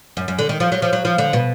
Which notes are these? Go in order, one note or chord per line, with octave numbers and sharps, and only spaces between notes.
F#2
F#2
D3
D#3
F3
F#3
F3
F#3
F3
D3
B2